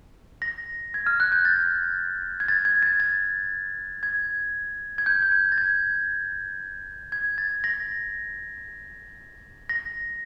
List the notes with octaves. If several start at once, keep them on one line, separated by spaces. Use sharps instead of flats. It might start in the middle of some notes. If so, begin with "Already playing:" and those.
A#6
G#6
F6
F#6
G6
A6
G#6
A6
G#6
A6
A6
G#6
G#6
G6
G#6
G6
A6
G#6
G#6
A6
A#6
A#6